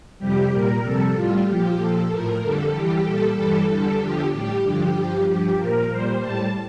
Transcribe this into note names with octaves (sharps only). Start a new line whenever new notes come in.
F2 C3 G3 G4
A#2 G3 A#4
F2 C3 G3 A4
A2 G3 F4
A#2 F3 G4
A#2 F3 A4
A2 F3 A#4
F2 D3 G3 A4
E2 E3 G3 G4
A#2 G3 A4
G2 E3 G3 A4
E2 D3 G3 A4
E2 D3 F3 G4
A2 G3 G4
G2 D3 F3
G2 F3
G2 F3 G4
A#2 F3 A#4
A#2 G3 C5
A2 G3 A5